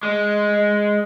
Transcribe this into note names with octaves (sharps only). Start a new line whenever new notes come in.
G#3